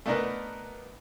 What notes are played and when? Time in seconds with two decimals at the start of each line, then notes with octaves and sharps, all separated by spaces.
0.06 A3 B3 D4 D#4 A#4 B4